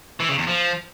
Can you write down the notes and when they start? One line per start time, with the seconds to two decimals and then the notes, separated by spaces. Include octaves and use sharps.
0.20 E3
0.29 C#3
0.38 E2
0.47 F3